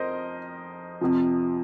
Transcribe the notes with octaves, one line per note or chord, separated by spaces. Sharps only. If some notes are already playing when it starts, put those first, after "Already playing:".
Already playing: F2 A#4 C5 D#5
F2 C3 F3